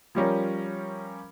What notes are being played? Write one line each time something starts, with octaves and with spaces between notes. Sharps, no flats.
F3 G3 C#4 A#4